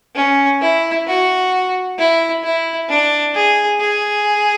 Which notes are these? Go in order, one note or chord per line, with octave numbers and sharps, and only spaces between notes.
C#4
E4
F#4
E4
E4
D4
G#4
G#4